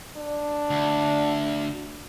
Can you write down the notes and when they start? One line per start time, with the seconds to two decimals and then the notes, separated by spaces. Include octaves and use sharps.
0.17 D4
0.70 D2